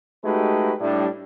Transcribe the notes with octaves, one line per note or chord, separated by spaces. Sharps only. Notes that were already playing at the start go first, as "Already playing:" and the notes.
G#3 A3 D#4 F#4 G4 B4
A2 G3 D4